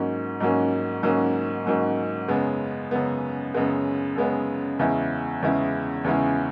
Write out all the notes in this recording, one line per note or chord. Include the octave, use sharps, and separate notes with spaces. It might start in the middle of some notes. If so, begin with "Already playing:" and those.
Already playing: G#2 F#3 A#3 C#4
G#2 F#3 A#3 C#4
G#2 F#3 A#3 C#4
G#2 F#3 A#3 C#4
F#2 C#3 G#3 B3
F#2 C#3 G#3 B3
F#2 C#3 G#3 B3
F#2 C#3 G#3 B3
E2 C#3 G#3 C#4 E4
E2 C#3 G#3 C#4 E4
E2 C#3 G#3 C#4 E4